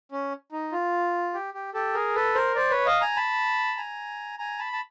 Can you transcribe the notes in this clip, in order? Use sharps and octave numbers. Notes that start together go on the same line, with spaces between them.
C#4
D#4
F4
G4
G4
G4 A4
G#4 A#4
A4 B4
A#4 C5
C5 D5
B4 C#5
D#5 F5
G#5 A#5
A5 B5
G#5 A#5
G#5 A#5
A5 B5
A5